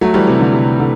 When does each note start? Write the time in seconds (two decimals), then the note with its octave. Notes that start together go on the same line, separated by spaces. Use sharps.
0.01 F#3 A3
0.14 E3 G3
0.27 C3 E3
0.40 D3
0.53 C3
0.80 D3